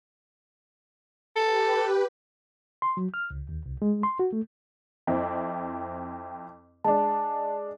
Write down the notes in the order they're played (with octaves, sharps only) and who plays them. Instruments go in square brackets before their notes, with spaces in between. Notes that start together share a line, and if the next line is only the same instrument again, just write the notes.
[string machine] G4 B4 [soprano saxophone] A4
[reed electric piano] C6
F#3
F6
C#2
D#2
C2
G#3
C6
F#4
A3
[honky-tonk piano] F2 C4 E4
[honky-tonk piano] G#3 D4 [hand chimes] A5